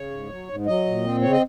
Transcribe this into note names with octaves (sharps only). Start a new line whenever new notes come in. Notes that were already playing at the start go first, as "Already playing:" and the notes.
Already playing: C#3 C#5
G#2
F#3
G#2
F#3 D#5
A#2
C4
C#3 C#5
D#5